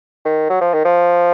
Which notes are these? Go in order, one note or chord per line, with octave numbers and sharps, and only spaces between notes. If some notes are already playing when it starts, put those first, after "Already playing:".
D#3
F#3
F3
D#3
F3